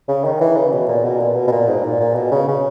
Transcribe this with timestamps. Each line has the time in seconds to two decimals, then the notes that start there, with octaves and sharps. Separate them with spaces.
0.08 C#3
0.24 D#3
0.41 E3
0.56 C#3
0.72 B2
0.88 A#2
1.05 B2
1.20 A#2
1.35 B2
1.48 B2
1.52 A#2
1.68 G#2
1.84 A#2
2.00 A#2
2.16 B2
2.31 C#3
2.48 C#3